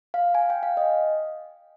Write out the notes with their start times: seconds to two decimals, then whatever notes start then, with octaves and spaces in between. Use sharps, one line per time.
0.14 F5
0.35 G#5
0.50 G5
0.63 F5
0.77 D#5